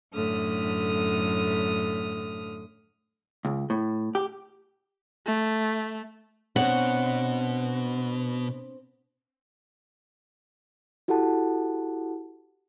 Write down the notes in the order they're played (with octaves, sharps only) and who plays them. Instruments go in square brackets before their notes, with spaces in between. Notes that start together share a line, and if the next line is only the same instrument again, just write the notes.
[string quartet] F#2 A2 D3 D#6 F6
[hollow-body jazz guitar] C#2
A2
G4
[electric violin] A3
[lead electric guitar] B2 [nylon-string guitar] C4 D4 C#5 [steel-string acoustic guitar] F#5
[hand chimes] E4 F#4 G4 A4 F#5 A5